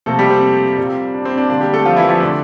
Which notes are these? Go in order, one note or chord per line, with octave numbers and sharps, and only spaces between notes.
C3 F3 A3 A#3 A4
G3 G4
C4
A#2 G3 A#3
D4
C4
D4
D3 G3 A#3 D4
G3 G4
A3 A4
F3 F4
E3 E4
F3 F4
D3 A3 D4